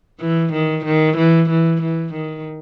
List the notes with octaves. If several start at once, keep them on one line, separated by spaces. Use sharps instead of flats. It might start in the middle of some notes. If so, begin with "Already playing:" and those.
E3
D#3
D#3
E3
E3
E3
D#3